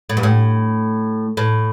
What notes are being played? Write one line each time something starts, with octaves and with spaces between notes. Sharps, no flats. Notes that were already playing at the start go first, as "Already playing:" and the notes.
A2
G2
A2
A2